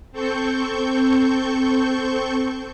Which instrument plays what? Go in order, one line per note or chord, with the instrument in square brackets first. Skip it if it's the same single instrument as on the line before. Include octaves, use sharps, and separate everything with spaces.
[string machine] C4 A4 C#6 G6